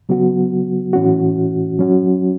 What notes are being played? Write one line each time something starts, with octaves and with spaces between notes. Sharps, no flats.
C#3 F#3 B3 F#4
A2 E3 C#4 F#4
F#3 C#4 F#4